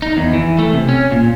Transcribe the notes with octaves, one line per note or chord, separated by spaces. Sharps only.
D#4
E2
E3
A3
C3
C#4
A#2